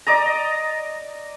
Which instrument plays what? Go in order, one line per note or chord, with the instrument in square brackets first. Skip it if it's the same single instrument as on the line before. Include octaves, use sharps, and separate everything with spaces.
[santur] D5 D#5 A#5